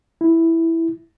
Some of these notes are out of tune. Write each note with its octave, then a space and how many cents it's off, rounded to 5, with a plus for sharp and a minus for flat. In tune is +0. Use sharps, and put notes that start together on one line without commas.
E4 +0